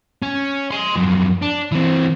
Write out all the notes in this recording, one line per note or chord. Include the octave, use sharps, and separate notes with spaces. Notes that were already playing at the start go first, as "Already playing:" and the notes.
C#4
G#5 C6
F#2 F3
D4
E3 C4